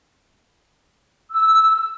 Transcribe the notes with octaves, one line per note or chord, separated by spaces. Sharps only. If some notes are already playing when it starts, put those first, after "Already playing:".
E6